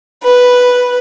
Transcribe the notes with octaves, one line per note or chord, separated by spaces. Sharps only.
B4